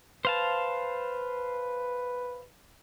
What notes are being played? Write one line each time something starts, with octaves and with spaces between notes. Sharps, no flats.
B4 C5 F5 A5